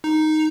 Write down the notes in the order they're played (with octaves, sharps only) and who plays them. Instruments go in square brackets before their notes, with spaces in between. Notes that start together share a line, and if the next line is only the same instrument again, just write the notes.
[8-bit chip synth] D#4